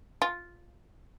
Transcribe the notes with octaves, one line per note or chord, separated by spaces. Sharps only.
F4